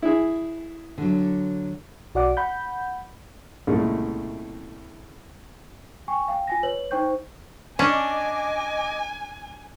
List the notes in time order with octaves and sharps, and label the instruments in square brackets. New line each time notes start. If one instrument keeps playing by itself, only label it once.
[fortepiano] E4 G#4
[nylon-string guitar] D3 F#3
[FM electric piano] B1 F#4 D5 F#5 D6
F#5 B5 G6
[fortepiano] C2 A#2 C#3 G#3 A3
[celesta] G5 G#5 C#6
F5 G5
F4 G#5 A#6
B4 C#5 F#7
D#4 C5 G5 C#6 G6
[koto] C#4 [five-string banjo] D4 [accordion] D#5 D6 [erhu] G#5